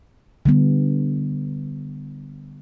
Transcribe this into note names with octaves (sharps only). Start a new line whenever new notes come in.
D3 G3 B3